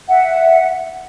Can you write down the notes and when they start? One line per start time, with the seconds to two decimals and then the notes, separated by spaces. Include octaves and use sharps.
0.08 E5 F#5